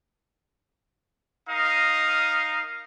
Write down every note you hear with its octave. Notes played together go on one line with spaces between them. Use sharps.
D#4 A#4 D#5 F5 D#6